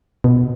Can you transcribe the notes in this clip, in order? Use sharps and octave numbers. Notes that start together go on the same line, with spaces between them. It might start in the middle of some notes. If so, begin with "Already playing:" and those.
B2